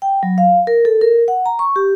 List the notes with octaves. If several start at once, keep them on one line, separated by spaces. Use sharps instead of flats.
G5
F#3
F5
A#4
A4
A#4
F#5
A#5
C#6
G4